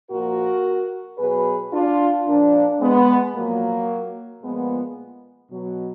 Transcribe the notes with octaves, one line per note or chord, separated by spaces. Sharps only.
A#2 F3 F#4 A#4
B2 F#3 G#4 B4
D4 F4
A#2 F3 A#3 D4
G#3 B3
A#2 F3 F#3 A#3
A#2 F3 G#3 B3
B2 F#3